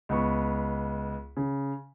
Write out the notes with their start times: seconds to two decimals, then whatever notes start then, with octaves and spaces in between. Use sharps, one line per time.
0.09 C#2 B3 C#6
1.37 C#3